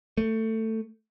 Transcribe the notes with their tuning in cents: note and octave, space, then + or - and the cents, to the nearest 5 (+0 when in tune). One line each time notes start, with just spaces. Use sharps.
A3 +15